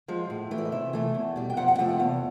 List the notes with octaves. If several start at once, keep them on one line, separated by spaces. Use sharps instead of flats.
F3 G#3
A2
E3 A3
D5
D#5
C3 E5
E3 A3
E2
B2 G3
G5
F2 F#5
F#5
C3 F3 A3 G5
F#5
E2 F5